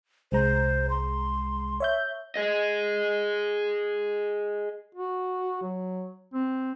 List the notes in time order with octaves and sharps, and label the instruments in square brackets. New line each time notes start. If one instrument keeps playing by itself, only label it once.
[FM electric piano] C2 G#3 A#5 [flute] C5
[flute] C6
[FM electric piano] C#5 E5 G6
[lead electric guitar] G#4 D#5
[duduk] F#4
F#3
C4